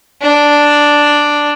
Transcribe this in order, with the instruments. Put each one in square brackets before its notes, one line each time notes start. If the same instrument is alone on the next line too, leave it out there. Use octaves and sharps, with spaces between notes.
[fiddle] D4